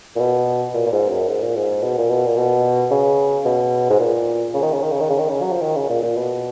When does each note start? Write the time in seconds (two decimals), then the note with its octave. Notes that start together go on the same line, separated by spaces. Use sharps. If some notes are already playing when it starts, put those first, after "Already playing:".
0.16 A#2
0.20 B2
0.74 A#2
0.86 A#2
0.92 G#2
1.10 F#2
1.29 G#2
1.42 A#2
1.57 G#2
1.83 B2
1.98 A#2
2.10 B2
2.26 A#2
2.37 B2
2.91 C#3
3.45 B2
3.90 G#2
4.00 A#2
4.54 C#3
4.63 D#3
4.72 C#3
4.82 D#3
4.91 C#3
5.00 D#3
5.10 C#3
5.19 D#3
5.28 C#3
5.42 F#3
5.52 F3
5.62 D#3
5.76 C#3
5.90 A#2
6.03 A#2
6.16 B2